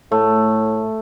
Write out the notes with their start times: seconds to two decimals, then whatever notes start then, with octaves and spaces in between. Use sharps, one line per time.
0.12 A2 A3